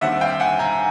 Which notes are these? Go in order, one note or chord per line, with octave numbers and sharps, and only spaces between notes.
D#2 D3 G3 C4 E5 F#5
F5 G5
F#5 G#5
G#5 A#5